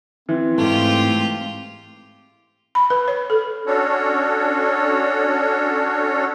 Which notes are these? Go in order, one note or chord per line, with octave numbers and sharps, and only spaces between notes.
E3 C4
G#2 A3 F4 G4
B5
B4
C#5
A4
C#4 D4 F#4 A4 C#5